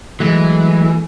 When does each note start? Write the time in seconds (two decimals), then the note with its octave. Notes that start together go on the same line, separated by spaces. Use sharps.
0.20 E3 F#3 G#3 A3